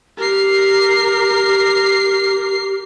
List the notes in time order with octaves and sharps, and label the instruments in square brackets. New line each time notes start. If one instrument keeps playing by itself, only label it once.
[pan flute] G4 [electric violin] A#4 C7